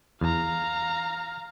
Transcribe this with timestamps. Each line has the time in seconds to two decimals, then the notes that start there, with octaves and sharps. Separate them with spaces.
0.21 E2 F5 A#5